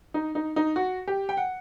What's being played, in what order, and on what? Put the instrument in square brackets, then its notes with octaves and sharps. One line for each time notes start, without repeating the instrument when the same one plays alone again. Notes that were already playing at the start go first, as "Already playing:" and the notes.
[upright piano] D#4
D#4
D#4
F#4
G4
G5
F#5